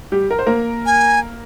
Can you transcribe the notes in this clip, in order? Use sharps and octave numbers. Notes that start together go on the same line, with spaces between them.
G3 G4
A#4
C5
A#3 A#4
G#5